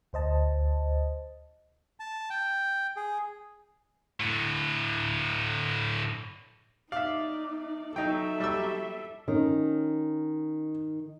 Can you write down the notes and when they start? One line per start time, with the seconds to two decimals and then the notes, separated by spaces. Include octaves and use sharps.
0.13 D2 C5 D#5 A5
2.00 A5
2.30 G5
2.96 G#4
4.20 A2 D3
6.92 D#4 D5 E5 F5
7.96 F#3 D#4 A4 E5 G5
8.40 G3 D6 E6
9.28 D#3 C#4